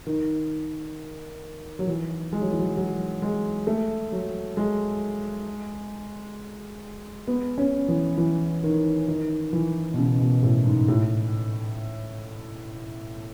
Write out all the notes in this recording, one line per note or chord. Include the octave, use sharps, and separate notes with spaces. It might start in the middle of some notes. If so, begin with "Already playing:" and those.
D#3
F#3
E3
G#3
F#3
E3
F#3
F#3
G#3
A3
F#3
G#3
B3
C#4
E3
E3
D#3
D#3
E3
B2
C#3
B2
A2
G#2
A2